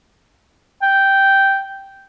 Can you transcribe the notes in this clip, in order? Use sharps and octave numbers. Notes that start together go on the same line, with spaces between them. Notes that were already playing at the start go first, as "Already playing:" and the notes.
G5